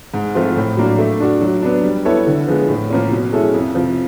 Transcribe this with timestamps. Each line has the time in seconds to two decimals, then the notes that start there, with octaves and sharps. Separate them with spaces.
0.14 G#2
0.35 F3 A3 C4 F4
0.57 A2
0.77 F#3 A#3 D4
0.99 A3
1.20 D4 F#4
1.41 F#3
1.62 B3 D4
1.84 G3
2.05 B3 E4 A4 C#5
2.27 D3
2.48 F3 G#3 B3
2.69 A2
2.90 F3 A#3 C#4
3.11 B2
3.33 G#3 C#4 E4 A4
3.54 F2
3.75 C3 F3